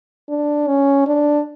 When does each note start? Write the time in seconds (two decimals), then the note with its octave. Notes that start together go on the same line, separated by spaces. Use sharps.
0.29 D4
0.68 C#4
1.07 D4